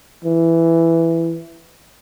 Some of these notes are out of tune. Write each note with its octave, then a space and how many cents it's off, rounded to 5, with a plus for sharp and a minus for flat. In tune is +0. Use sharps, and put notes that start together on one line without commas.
E3 +10